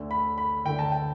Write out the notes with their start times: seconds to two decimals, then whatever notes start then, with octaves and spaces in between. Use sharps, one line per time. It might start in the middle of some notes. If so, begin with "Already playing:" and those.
Already playing: D2 D3 A3
0.11 B5
0.38 B5
0.65 D2 D3 A3 G5
0.79 A5
0.92 G5